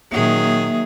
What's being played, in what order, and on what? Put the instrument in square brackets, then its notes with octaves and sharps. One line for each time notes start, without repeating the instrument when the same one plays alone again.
[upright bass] A#2 C#4 [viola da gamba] D#3 F#3 G#4 [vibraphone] A#3 E5